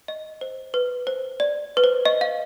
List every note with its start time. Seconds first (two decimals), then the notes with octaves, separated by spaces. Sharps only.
0.08 D#5
0.41 C5
0.74 B4
1.07 C5
1.40 D5
1.77 B4
1.84 C5
2.05 D#5
2.21 F5